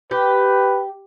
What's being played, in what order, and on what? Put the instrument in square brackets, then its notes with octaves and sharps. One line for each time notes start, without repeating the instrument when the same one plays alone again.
[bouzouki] G4 [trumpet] B4